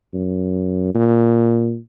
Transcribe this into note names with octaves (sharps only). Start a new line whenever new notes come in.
F#2
A#2